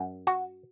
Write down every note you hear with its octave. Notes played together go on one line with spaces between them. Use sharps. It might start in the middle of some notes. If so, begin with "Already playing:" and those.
Already playing: F#2
F#4